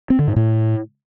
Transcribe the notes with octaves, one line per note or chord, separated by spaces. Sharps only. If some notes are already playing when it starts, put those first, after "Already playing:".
C4
D3
G#2
A2